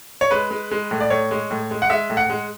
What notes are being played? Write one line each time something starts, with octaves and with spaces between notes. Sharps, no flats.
C#5
G#3 B4
G#3
G#3
A2
D5
A2 C#5
G#3
A2
G#3
F#5
G#3 E5
A2
F#5
G#3